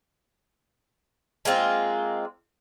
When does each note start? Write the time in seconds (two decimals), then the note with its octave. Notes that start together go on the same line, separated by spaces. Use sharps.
1.45 G#3 A#3 C4 F4